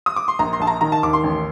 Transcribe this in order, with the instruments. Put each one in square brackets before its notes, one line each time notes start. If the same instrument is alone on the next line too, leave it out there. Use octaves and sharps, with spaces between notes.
[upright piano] D#6
D6
C6
[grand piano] A#1 [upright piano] A#5
[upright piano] C6
[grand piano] A#1 [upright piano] A5
[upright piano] A#5
[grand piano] D#3 [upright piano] A#5
[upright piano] A5
[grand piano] D#2 [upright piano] D6
[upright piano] C6
[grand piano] A1